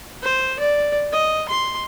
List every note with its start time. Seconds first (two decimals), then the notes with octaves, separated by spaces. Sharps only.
0.23 C5
0.59 D5
1.12 D#5
1.48 C6